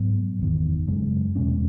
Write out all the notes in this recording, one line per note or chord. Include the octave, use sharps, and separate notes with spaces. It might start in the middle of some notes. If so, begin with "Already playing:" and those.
Already playing: G#2 F#3 B3
F#1 E2 D#3
F#2 C#3 G#3
E2 B2 G#3 C#4